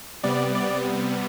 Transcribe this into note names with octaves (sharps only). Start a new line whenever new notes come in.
C3 G3 B3 D5
D5